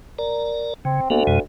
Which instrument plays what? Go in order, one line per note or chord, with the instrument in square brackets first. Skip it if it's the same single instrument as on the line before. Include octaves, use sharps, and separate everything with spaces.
[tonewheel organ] A#4 D5 A#5
[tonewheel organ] C#3 [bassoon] C4
[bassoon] D2 [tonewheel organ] A#3 B3
[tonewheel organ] F2 B2 G#3